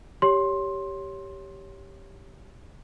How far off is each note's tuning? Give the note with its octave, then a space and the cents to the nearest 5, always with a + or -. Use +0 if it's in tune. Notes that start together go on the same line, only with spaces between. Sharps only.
G4 +0 C#5 +5 C6 +10